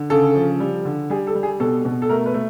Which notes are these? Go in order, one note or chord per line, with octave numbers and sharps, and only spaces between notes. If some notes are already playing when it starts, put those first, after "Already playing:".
Already playing: D3
C#3 A4
F3
G3
D3
G3 G#4
A4
G3
G#4
B2 A4
B2
A4
A3 A#4
B4
A3